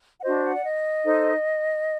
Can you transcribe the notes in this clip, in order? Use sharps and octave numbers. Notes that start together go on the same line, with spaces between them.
F#5
D4 F#4 C5 D#5
F#5
D5
D#5
D#4 A4 C5